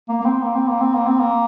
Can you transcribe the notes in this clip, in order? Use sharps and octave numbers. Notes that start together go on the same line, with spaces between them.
A#3
A#3
C4
A#3
C4
A#3
C4
A#3
C4
A#3